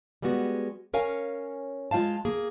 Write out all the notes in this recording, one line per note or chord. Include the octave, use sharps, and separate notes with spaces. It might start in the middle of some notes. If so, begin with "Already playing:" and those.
G3 G#3 B3 F#4
C#4 A#4 C#5 F5 G#5
G#3 F4 C5 F5 A5
A#3 G#4